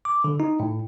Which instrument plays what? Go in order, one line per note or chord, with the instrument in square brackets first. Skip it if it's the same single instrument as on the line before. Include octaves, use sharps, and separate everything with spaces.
[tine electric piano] D6
D3
D#4
A2